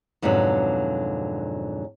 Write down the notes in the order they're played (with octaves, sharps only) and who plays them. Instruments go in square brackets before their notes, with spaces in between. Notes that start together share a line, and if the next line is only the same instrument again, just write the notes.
[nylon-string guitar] F2 G#2 B2 D3 F#3